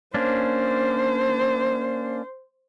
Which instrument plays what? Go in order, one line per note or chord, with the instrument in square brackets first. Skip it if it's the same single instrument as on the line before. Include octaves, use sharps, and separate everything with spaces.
[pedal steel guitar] A#3 C#4 D4 [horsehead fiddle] C5